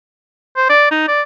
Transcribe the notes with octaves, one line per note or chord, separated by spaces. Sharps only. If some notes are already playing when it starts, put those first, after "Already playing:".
C5
D5
D#4
D5